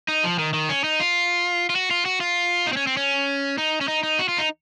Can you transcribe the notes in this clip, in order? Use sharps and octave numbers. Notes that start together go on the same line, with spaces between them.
D#4
F3
D#3
D#3
C#4
D#4
F4
F4
F#4
F4
F#4
F4
D#4
C4
C#4
C4
C#4
D#4
C#4
D#4
D#4
F#4
F4
D#4